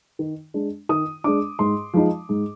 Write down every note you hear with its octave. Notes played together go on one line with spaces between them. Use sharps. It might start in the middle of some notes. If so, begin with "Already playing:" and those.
D#3
G#3 D4
D#3 D#6
G#3 D4 D6
G#2 C6
F3 G#3 D#4
G#2